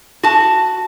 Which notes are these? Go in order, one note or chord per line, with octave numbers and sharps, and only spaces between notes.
F#4 A5